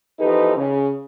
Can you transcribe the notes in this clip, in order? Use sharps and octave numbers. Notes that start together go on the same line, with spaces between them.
E2 F3 D#4 G4 A4 B4
C#3